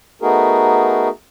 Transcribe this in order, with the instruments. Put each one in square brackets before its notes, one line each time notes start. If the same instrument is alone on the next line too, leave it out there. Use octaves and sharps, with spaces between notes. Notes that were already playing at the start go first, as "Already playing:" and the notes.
[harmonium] A3 B3 D#4 F#4 G#4 A#4